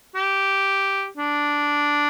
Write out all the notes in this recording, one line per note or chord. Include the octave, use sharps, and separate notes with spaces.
G4
D4